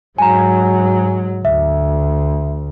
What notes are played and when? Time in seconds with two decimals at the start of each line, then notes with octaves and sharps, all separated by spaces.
0.18 G#2 F#3 G#5 A#5
1.45 D2 E5